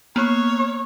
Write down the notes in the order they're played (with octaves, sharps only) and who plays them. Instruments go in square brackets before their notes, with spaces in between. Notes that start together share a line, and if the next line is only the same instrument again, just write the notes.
[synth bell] A#3 B3 [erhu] C#5